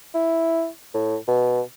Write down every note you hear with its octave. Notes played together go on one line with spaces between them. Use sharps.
E4
A2
B2